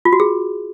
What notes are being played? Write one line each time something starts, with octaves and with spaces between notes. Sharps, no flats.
F4
F#4
G#4